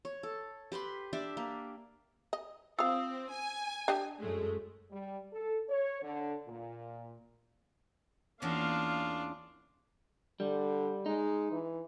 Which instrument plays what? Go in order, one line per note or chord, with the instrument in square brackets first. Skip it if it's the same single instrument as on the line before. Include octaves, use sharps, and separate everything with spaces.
[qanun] C#5
A4
G4 B4 B5 C6
D4 G4 D5 E5
A#3
[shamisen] D#5
[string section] C4 [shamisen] F4 F5 [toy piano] D#6 E6
[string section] G#5
[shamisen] D4 G4 D#5
[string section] F#2 G#3 A3
[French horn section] G3
A4
C#5
D3
A#2
[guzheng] E2 C#4 [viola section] A#3 F5 [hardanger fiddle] D4 F4
[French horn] D3 [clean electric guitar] G3
[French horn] G#3 [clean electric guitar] D#4
[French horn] E3